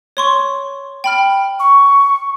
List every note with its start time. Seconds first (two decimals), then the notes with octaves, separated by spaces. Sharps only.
0.17 C#5 C6 C#6
1.04 G5 B5 F6
1.60 C#6